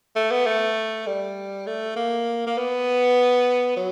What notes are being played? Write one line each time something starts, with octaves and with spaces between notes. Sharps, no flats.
A3
B3
A3
G3
A3
A#3
A#3
B3
F#3